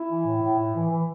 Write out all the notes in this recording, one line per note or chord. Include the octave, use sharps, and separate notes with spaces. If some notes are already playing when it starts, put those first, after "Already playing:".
Already playing: E4
E3
A2
A2
A2
E3
E3